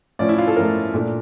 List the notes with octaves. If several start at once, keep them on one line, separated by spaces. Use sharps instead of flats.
A2 F3 C#4 D5
E4
F4
A4
A2 F3 C#4 A#4
A#2 A3 D4